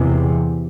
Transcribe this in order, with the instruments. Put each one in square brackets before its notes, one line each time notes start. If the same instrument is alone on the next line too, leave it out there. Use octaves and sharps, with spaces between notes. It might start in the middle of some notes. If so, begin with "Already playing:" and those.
Already playing: [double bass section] E2 C3